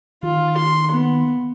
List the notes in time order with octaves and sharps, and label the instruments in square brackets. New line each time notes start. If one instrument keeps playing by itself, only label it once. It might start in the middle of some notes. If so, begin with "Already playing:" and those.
[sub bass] D#3 [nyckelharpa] F4
[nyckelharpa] C6
B3